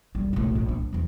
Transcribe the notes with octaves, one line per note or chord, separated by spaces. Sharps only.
G3
B1 A2
A#1
D4
E2 F3